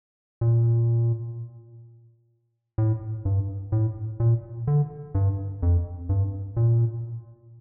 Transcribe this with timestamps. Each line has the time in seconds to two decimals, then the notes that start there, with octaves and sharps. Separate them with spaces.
0.41 A#2
2.78 A2
3.25 G2
3.72 A2
4.20 A#2
4.67 D3
5.15 G2
5.63 F2
6.09 G2
6.57 A#2